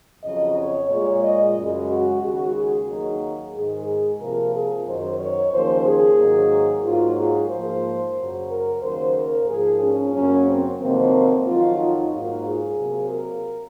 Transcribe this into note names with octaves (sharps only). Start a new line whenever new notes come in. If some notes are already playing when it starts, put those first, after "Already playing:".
F2 C#3 F#3 D#5
C#5
A#2 G#3 C#5
D#5
F#2 C#3 G#3
F#4
D#2 C#3 G#3 F#4
G#4
D#2 D#3 F#3 A#3
G#2 D#3 G#3 G#4
C3 F3 A#3 A#4
G#4
F#2 D#3 F#3 C5
C#5
D#2 C#3 F3 A#3 C5
G#4
G#2 D#3 F#3 A#3
G#2 F#3 A#3 F4
G#4
G#2 F3 A#3 C5
F#2 C#3 F#3
A#4
D#2 C#3 F#3 A#3 C5
A#4
G#2 F3 A#3 G#4
C#4
F#2 C#3 F#3 A#3 C#4
C4
F2 C3 D#3 F#3 A#3 C4
F2 D#3 F#3 F4
D#4
G#2 F#3 A#3 F4
G#4
C3 F#3 A#3
A#4